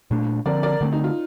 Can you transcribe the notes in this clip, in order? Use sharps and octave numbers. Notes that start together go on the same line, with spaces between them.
A#2 A3 D4
D3 F3 C4 A#4 D5
A#4 D5
D3 A3 C4
D#4
F4